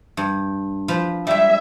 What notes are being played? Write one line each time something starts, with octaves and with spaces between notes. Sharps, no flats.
G2
F3 F4 B4
G3 G#3 E5